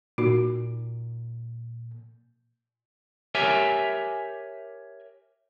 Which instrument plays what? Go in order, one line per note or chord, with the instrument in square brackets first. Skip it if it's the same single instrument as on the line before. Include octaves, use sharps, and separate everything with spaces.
[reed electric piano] A#2 [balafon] D#4 F#4
[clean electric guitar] G4 A#4 C#5 E5 G#5